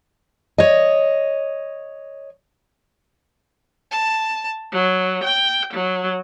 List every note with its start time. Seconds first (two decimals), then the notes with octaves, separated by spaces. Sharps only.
0.58 C#5 D#5
3.91 A5
4.72 F#3
5.23 G5
5.72 F#3